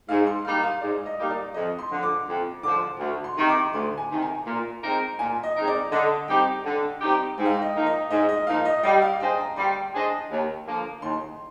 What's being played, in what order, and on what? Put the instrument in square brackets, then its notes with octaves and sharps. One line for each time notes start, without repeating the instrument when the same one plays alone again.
[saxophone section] G#2 [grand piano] F5
[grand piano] C6
[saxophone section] G3 A#3 D#4 G4 [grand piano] F5
[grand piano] F5
[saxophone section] G#2 [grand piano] D5
[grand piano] D#5
[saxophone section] G3 A#3 D#4 G4
[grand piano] D5
[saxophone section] F2 [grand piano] D#5
[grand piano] C6
[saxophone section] D3 F3
[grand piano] D6
[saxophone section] F2
[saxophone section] D3 F3 [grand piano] D6
[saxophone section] D2
[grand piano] C6
[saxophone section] C3 D#3
[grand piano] D6
[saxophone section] D2 [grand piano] C6
[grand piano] G#5
[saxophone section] C3 D#3
[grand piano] G#5
[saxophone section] A#2
G#3 C4 D#4 A#4
[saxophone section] A#2 [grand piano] G#5
[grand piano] D#5
[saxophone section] G#3 C4 D#4 A#4
[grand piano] D5
[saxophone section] D3 [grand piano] D#5
[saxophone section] G3 C4 D#4 G4 [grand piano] G5
[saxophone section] D3
G3 C4 D#4 G4
[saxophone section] G#2 [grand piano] G5
[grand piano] F5
G5
D#5
[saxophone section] F3 A#3 D#4
[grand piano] D#5
[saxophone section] G#2 [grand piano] D#5
[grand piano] D#5
[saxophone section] F3 A#3 D#4 [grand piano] F5
[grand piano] D#5
[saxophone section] G3 [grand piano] D#5
[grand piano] F5
[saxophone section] D4 G#4 C5 D#5 [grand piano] G5
[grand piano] A#5
[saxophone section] G3 [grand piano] C6
[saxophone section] D4 G#4 C5 D#5
D#2
D3 F3 A#3
[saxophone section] D#2 [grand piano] C6